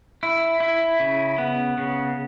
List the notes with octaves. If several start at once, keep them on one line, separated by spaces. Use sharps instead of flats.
E4
E4
C#3
B3
C#3